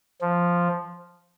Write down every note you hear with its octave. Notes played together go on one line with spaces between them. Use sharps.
F3